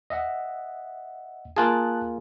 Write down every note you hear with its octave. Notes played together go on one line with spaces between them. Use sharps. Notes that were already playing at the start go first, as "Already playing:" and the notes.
D#5 E5 F#5
A#3 F4 G#4 A5 D#6 F#6